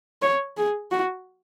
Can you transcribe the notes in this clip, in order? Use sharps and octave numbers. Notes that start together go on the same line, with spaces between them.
C#5
G#4
F#4